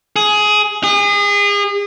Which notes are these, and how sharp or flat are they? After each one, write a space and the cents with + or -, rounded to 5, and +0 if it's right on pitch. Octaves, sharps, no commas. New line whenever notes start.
G#4 +15
G#4 -35